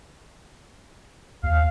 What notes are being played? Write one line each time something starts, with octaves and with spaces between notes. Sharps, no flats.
D#2 F5